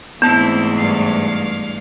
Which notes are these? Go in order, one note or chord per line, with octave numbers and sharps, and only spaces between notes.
E2 G#2 A3 B3 C4 E4 A5
G2 F5